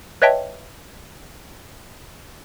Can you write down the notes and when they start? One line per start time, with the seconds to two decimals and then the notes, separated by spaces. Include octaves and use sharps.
0.22 B4 C#5 D#5 E5 G5 A5